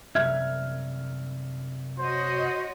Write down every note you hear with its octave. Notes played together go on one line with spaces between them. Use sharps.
C2 F#2 E5 F6 G#6
F#4 C5 C#5 D#5